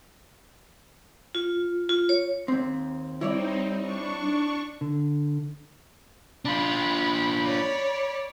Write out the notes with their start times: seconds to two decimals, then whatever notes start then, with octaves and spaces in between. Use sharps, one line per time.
1.35 F4
1.89 F4
2.09 C#5
2.48 D#2 C4
3.21 G3 C4 D#4 E4 C#5 D5
3.79 D4 C#6
4.81 D3
6.45 D4 F4 B5
7.42 C#5 D5